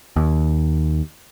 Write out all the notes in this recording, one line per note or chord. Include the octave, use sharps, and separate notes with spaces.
D#2